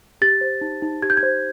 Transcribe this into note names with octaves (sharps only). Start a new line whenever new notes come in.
G4 A6
C5
D#4
D#4
G4 G#6
G6
G#6
C5